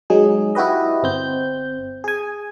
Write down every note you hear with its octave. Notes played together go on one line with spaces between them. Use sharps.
F#3 G#3 D#4 G#4
E4 F#4 G4 B4 D#5
G1 C4 G6
G#4 G#5